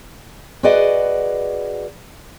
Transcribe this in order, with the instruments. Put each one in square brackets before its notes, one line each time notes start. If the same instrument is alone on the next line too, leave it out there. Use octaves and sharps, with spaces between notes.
[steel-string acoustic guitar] F#4 G#4 B4 D5 D#5 F#5